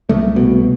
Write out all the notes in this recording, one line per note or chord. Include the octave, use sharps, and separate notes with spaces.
C2 A3
B2